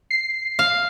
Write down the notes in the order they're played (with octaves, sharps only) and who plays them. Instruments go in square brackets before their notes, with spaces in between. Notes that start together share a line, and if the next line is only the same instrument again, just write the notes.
[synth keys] C7
[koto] F5